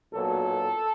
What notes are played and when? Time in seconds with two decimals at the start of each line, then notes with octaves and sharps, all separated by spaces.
0.12 B1 A#2 F#3 B3 A4